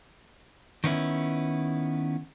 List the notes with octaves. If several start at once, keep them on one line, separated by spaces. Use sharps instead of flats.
D#3 B3 C#4 E4